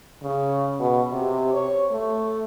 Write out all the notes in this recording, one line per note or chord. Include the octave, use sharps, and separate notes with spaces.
C#3
B2
C3
C#5
A3